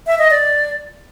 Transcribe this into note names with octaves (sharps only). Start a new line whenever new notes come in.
E5
D#5
D5